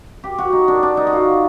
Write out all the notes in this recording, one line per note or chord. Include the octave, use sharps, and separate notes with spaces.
G4
F#4
D#4
D4
D4
D#4
F#4
F4